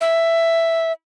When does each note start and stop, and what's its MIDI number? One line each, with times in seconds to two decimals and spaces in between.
0.01 0.92 76